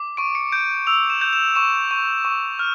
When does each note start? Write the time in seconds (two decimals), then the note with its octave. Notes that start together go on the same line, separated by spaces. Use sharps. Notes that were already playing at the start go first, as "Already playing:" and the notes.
Already playing: D6
0.17 C#6 D7
0.35 C#7
0.52 G6 D7
0.87 E6 F7
1.10 E7
1.21 G6
1.33 E7
1.55 C#6 E7
1.91 C#6
2.25 C#6
2.59 F6